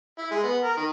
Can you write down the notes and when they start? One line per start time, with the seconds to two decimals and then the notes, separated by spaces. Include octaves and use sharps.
0.18 E4
0.31 G#3
0.43 B3
0.64 A#4
0.77 D#3